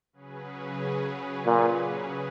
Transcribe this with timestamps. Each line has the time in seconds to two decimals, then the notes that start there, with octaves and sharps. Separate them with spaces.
0.13 C#3 F#3 C#4 G#4 B4
1.46 A#2